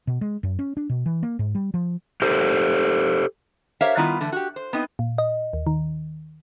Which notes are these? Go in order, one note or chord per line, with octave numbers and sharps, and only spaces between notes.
B2
G#3
F#2
C#4
D4
B2
E3
A#3
G#2
G3
F3
G4 A4 C5
G4 A#4 C5 C#5 E5 F5
D#3 G3 B3 E4 F4
D3 E3 A3
F#4 G4
C5
B3 C4 D#4
A#2
D#5
D#2
D#3